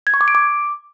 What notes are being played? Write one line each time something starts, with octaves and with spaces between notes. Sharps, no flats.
G#6
C#6
D6
D7
D6